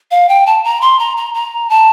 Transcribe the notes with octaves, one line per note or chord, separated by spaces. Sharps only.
F5
G5
A5
A#5
C6
A#5
A#5
A#5
A5